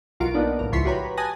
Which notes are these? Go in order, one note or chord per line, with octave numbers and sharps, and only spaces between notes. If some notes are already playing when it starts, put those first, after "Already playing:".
B1 F4 F#4 A#4 D7
A#3 B3 D4 D#4
B1 A2 A#4
C#2 F3 E4 C6 C#6 B6
F#4 G4 B4 C#5 A#5 B5
G#5 A5 D#6 F#6 A6 A#6